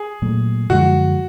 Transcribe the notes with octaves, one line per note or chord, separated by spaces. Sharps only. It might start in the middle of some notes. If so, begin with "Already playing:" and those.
Already playing: G#4
A#2 F#3 A3
F#2 D3 F3 G#3 F#4